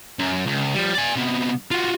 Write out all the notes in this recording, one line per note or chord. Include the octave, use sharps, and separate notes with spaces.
F#2
C#2
F3 G3
D5 G#5
C3 B3
F4 F#4